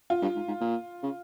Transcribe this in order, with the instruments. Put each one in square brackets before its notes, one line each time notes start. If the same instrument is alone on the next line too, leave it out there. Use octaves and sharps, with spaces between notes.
[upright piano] F4
[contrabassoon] G2
G#2
G#2
A#2
C#3